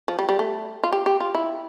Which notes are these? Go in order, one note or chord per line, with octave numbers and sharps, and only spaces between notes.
F3
G3
G3
A3
F4
G4
G4
F4
E4